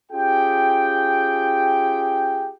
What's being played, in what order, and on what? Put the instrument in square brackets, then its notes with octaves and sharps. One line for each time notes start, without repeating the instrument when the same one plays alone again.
[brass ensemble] C#4 F4 G4 G#4 G5